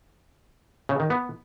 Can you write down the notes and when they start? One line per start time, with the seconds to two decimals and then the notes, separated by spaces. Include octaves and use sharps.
0.89 C#3
1.00 D#3
1.10 B3